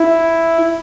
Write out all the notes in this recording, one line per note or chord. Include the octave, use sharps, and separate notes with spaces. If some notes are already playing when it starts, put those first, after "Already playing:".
Already playing: E4